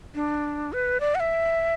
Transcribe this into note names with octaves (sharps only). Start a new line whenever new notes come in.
D4
B4
D5
F#5
E5